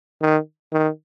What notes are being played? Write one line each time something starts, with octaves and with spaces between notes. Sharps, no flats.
D#3
D#3